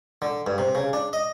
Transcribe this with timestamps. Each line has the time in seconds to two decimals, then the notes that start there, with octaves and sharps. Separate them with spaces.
0.22 D3
0.47 G2
0.58 C3
0.75 C#3
0.93 D4
1.13 D#5